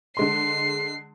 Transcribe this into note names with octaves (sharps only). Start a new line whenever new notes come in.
D3 G#3 C6 C7